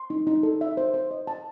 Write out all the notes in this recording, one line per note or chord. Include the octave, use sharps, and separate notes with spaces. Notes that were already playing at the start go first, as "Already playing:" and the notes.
Already playing: C6
D#4
D#4
A4
E5
C5
C5
D#5
A5